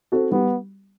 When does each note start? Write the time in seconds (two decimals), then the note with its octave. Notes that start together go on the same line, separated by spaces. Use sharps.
0.12 C4 F#4 A4
0.31 G3 B3